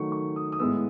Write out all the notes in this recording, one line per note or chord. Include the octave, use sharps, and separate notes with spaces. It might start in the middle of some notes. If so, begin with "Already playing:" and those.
Already playing: D#3 F#3 A3 C#6
C#6
D#6
D#6
A2 G#3 B3 E6